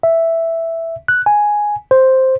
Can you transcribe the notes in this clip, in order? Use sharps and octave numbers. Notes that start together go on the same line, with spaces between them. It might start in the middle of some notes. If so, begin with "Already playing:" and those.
E5
F#6
G#5
C5